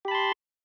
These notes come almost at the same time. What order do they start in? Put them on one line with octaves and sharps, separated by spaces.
G4 B5 A5 C6